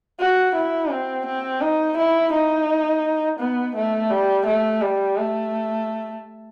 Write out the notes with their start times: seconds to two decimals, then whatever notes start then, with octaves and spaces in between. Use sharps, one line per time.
0.19 F#4
0.56 E4
0.91 C4
1.26 C4
1.61 D#4
1.97 E4
2.33 D#4
3.40 B3
3.75 A3
4.10 G3
4.47 A3
4.82 G3
5.17 A3